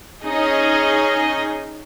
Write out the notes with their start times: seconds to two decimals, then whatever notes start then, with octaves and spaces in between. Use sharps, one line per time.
0.24 C#4 D#4 G#4 D#5